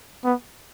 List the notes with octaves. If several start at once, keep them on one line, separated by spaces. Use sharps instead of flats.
B3